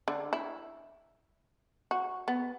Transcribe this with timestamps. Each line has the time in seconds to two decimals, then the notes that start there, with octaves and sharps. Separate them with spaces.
0.08 D3
0.33 E4
1.91 F#4
2.28 B3